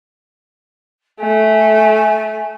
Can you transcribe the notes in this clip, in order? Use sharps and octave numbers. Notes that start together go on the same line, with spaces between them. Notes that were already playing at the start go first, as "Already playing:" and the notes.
A3 G#5